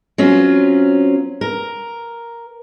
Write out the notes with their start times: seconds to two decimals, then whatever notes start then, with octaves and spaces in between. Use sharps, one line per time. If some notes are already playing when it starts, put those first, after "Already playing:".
0.18 F#3 C4 C#4 F4
1.41 A#4